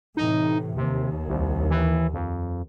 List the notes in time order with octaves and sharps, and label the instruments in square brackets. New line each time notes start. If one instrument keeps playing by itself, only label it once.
[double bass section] A2 C3 E3 [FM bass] D#4
[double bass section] D#2 [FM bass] C3
[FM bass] C2
E3
F2